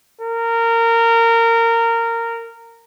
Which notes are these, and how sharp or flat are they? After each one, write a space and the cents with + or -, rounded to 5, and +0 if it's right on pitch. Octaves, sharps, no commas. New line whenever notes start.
A#4 -20